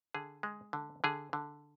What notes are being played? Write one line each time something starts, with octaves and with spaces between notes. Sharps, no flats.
D3 G#4
G#3
D3
D3 G#4
D3